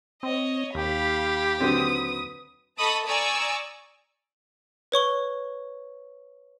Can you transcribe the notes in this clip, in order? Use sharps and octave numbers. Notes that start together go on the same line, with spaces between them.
C4 C#5 D#5
D#2 G4 F5 B5
D3 F#3 C4 B4 D#6
A4 D#5 A5 B5 C#6 D#6
D5 G#5 A#5 C#6 D#6 E6
B4 C#5 C#6 G7